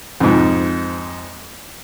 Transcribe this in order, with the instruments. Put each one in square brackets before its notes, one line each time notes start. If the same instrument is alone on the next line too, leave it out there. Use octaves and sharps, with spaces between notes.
[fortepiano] F2 G#2